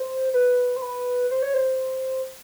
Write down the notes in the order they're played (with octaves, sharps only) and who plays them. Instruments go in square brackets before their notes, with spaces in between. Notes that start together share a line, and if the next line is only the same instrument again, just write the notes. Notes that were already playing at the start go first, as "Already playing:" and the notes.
Already playing: [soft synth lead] C5
B4
C5
B4
C5
C#5
C5